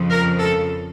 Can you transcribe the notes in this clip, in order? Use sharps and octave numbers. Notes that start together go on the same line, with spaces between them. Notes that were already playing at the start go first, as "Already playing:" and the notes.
Already playing: F2 C#3 F3
A#4
A4